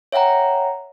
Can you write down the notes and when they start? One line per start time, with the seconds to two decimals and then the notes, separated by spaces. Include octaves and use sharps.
0.12 C#5 E5 F#5 G5 A#5